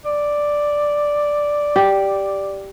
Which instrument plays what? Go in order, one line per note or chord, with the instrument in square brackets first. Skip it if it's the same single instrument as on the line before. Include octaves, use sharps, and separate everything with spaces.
[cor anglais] D5
[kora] G4